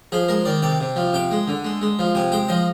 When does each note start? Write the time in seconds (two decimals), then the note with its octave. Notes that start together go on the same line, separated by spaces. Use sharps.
0.12 F3 G#4
0.28 G#3 A#4
0.45 D#3 D5
0.62 C3 D5
0.80 C3
0.96 F3
1.13 C3 G5
1.31 G#3
1.48 D3
1.65 G#3
1.81 G#3
1.99 F3
2.15 C3 G#5
2.32 G#3 G5
2.49 F3 D#5